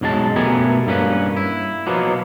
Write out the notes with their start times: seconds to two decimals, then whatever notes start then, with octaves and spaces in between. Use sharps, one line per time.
0.01 B1 F#2 F#3 G#3 A5
0.36 B2 A3 B3 G4 A#4 G#5
0.87 G2 A#3 C#4 B4
1.37 E4
1.87 B2 F3 F#3 A#3 B3